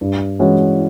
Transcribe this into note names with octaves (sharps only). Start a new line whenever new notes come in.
G2
E3 G#3 C#4 F#4